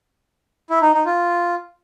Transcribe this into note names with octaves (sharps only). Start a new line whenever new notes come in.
E4
D#4
D#4
F4